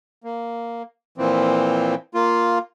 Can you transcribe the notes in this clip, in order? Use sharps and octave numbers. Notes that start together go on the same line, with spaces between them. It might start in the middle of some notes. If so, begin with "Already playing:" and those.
A#3
A#2 E3 F3 C4
A#3 F4